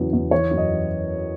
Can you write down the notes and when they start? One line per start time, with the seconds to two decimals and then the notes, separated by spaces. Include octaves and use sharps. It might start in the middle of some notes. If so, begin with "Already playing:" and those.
Already playing: E2 C#3 F#3
0.13 E2
0.31 E3 C#5
0.51 F#2
0.57 D#5
0.70 E3